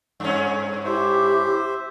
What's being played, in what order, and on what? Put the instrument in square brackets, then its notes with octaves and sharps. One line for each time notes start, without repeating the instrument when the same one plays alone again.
[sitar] G2 C#4
[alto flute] E4 [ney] G4 [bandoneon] C5 E5